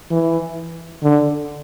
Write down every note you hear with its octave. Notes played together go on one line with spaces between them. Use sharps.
E3
D3